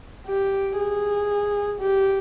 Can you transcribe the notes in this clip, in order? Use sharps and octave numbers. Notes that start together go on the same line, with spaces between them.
G4
G#4
G4